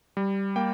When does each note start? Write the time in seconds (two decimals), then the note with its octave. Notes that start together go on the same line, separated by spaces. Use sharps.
0.17 G3
0.56 A#3 G5